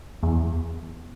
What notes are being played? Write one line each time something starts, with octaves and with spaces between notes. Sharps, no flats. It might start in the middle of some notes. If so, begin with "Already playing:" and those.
E2